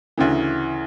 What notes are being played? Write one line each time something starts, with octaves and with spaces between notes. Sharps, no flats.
D2 C#3 E3